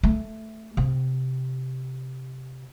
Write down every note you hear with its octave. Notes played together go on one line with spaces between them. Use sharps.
A3
C3